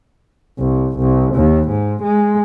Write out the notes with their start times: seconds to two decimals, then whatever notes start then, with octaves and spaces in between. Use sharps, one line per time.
0.58 C2
0.99 C2
1.35 D#2
1.69 G#2
2.02 G#3